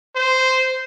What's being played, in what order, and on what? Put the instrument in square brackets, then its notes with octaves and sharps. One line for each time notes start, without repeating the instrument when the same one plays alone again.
[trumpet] C5